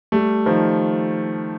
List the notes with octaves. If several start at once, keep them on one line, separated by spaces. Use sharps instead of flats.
G3 A3
D#3 F3